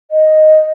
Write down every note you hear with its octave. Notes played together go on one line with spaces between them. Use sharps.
D#5